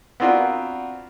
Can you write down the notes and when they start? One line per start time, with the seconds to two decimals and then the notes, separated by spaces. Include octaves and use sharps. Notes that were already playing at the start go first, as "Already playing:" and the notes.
0.20 B3 C4 D4 F4 F#4 A#4